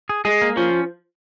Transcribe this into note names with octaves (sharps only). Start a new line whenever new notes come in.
G#4
G#3 G#4
A#3
F3 C#4